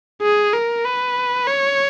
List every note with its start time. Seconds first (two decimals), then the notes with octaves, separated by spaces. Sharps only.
0.22 G#4
0.53 A#4
0.85 B4
1.47 C#5